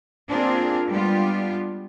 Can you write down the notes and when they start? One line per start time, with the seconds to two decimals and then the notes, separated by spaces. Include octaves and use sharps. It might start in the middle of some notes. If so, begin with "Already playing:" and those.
0.29 A#3 C4 D4 F4 G#4 A#4
0.88 G3 G#3 B3 D4 F4 G4